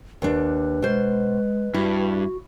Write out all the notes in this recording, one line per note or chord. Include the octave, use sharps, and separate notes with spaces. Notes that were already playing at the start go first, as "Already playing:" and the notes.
D#2 D4 B4
B2 G#3 C5
G2 E4 F#4